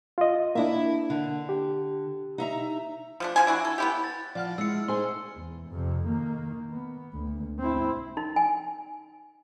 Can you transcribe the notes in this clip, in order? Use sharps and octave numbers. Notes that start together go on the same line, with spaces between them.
F4 D#5
A#3 D4 E4 E5
D3
G4
D#4 E5 A#5
F3 A3 D4
F3 E4 G#5
D4 E4 F#4
A4
B3 E4 G4
A6
F3 D5 F#5 F6
G#3 E4 E6 C#7
D#4 G#4 C5 C6
E2
F2 C3
D#3 A#3
B3
D2
C4 E4
D#4
G#5